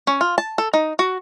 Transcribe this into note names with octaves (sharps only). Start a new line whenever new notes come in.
C#4
F4
A5
A4
D#4
F#4